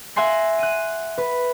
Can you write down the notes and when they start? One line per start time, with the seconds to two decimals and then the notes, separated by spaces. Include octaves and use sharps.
0.16 E5 F#5 G#5 C6 A#6
0.59 F#6 D#7
1.18 B4